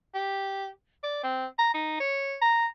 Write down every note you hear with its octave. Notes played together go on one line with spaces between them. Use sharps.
G4
D5
C4
A#5
D#4
C#5
A#5